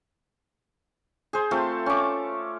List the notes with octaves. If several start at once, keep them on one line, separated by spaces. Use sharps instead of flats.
G#4 C5
A3 C4 F4 A4
C#4 D6